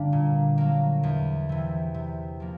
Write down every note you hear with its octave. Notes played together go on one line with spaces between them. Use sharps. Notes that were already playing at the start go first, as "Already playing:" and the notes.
Already playing: G2 D3 G3 A#3 D4
A#2
F#3 A#3
E2
C3 E3
C3
F3 A#3